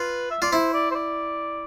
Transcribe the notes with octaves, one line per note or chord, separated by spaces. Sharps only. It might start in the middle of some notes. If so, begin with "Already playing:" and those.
Already playing: F4 B4
E5
F4 D5
E4 C5
D5
C5
D5